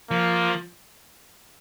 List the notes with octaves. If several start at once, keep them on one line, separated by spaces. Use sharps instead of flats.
F3 A#3